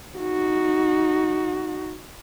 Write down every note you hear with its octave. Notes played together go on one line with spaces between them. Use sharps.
D#4 F#4